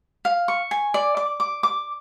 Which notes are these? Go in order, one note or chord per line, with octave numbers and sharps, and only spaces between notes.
F5
C#6
G#5
D5
D6
D6
D6